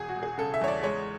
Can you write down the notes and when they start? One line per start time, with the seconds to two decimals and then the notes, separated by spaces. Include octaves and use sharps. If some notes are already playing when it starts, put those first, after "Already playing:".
Already playing: E1 G#4
0.09 F#4
0.16 E1
0.23 G#4
0.38 C#3 A4
0.54 E5
0.61 E2 C#5
0.68 D5
0.83 G#3 C#5